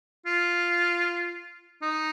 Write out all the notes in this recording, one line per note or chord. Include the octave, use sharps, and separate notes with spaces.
F4
D#4